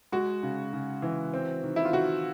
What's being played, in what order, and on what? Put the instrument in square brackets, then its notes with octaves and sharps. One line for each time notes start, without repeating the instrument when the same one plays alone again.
[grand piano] G#3 [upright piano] F#4
[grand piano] C#3
C#3
E3
C4
D#3
[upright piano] E4
F4
[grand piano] D#3 [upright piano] F#4